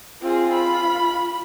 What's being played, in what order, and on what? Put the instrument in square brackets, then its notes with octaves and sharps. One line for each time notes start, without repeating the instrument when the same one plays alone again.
[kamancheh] C4 G#4 [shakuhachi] F4
[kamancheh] B5